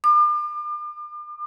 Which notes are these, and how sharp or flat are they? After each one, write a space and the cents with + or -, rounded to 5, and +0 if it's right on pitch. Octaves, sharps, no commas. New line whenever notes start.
D6 +40